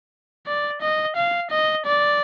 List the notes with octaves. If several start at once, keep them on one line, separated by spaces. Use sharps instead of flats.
D5
D#5
F5
D#5
D5